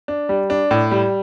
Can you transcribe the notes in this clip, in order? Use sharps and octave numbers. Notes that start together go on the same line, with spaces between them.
D4
G3
D4
A2
G3